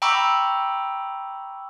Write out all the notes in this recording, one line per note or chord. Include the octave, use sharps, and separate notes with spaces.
G5 A#5 B5 C#6 D6 E6